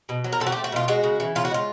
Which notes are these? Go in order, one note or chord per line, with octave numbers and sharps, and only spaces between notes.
B2
F#3
A#4
C4 A4
F#4
G4
A3
F#4
B2 F4
G#3 F#4
C#3
E3
C#3 F4
F#4
G#3 F4